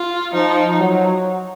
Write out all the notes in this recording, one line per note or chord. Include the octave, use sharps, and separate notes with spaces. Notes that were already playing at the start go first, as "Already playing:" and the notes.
Already playing: F4
F3 D#4
F#3